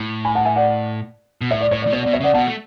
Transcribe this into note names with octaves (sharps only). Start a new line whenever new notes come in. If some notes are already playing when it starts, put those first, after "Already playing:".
Already playing: A2
G#5 B5
F#5 A5
E5 G#5
D5 F#5
B2
A2 C#5 E5
D5
A2 C#5
D5
A2
B2 C#5
D5
B2
C#5 E5
C#3 D5 F#5
B2 F#5 A5
A3